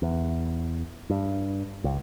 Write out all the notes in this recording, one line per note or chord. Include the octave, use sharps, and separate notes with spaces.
E2
G2
C#2